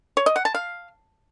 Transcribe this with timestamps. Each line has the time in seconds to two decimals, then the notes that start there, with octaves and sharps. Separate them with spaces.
0.17 C#5
0.26 D#5
0.36 F#5
0.45 A5
0.55 F5